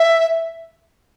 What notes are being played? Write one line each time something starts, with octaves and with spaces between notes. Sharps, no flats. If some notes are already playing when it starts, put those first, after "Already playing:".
Already playing: E5